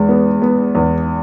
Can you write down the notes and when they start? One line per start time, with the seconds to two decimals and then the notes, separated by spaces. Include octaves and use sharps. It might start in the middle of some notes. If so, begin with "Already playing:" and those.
Already playing: E2 G#3
0.09 B3
0.42 B3
0.75 E2